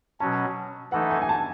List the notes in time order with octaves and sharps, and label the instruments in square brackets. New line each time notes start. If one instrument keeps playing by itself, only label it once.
[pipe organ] B2 F#3 C#4 [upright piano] A5
[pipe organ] E3 A3 D#4 A4 [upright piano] F#5
[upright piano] G#5
G#5
A5